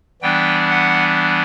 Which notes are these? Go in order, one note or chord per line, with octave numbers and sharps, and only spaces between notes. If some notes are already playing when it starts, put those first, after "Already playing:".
E3 G3 B3 D4 G5
F#5